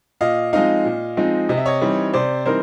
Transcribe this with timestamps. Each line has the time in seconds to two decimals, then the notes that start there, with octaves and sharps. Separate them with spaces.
0.21 A#2 D#5 F5
0.53 F3 G#3 C4 D#4 D#5 F5
0.85 A#2
1.17 F3 G#3 C4 D#4
1.49 C3 D#5
1.57 E5
1.66 C#5 D#5
1.81 E3 G3 C4 D#4
2.13 C3 C5 D5
2.45 E3 G3 C4 D#4 A#4 C5